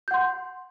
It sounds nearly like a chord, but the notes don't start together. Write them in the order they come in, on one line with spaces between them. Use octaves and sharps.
G6 F#5 C6